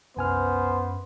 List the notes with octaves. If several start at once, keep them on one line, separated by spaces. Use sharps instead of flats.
C2 F#2 B3 C5 G#5 F6